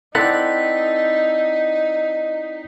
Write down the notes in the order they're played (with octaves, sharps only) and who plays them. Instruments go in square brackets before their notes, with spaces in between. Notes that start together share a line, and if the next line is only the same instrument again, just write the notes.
[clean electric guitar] C4 A4 F#5 [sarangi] D#4 [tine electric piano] E4 D5 G5 [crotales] B6